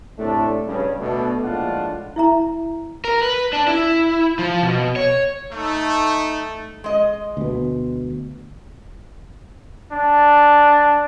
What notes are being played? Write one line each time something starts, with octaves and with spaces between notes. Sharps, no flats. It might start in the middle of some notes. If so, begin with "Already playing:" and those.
A2 C3 A3 D4
G2 C#3 C#4
B2 A3 D4
A#1 A2 G#3 D4 F4 F#5
E4 E5 A#5
A#4
B4
D4
E4
F3
B2
C#5
A3 D#4
G#3 D#5
D2 B2
D4